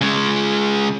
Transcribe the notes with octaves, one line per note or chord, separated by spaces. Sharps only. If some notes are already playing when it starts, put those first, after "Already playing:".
C#3 G#3